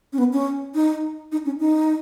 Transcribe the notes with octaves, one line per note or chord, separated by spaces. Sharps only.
C#4
B3
C#4
D#4
D#4
C#4
D#4